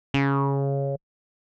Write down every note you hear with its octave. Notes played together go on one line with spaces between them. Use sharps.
C#3